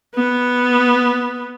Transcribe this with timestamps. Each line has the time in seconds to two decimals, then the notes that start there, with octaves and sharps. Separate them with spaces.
0.15 B3